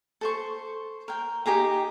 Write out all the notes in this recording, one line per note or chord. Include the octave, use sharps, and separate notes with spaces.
A4 C5 C#6
A#4 G5
D#4 G4 G#4 A#5